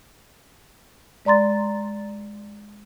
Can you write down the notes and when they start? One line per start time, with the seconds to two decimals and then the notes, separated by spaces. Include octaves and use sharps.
1.25 G#3 D5 A#5 C6 A6